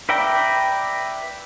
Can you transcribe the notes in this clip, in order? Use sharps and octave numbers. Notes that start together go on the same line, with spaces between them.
B4 D5 E5 G5 A#5